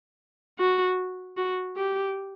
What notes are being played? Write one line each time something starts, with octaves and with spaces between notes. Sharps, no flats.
F#4
F#4
G4